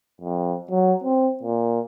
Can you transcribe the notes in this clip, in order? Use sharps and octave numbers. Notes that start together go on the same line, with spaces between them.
F2
F#3
C4
A#2